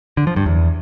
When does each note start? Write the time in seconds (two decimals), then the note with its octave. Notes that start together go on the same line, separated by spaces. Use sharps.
0.17 D3
0.27 F3
0.36 G2
0.46 E2